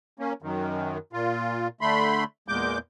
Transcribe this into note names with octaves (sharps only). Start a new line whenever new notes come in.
A#3 C#4
F#2 D#3
A#2 F4
D3 A3 B5 C6
E2 A#2 G#3 D6 G6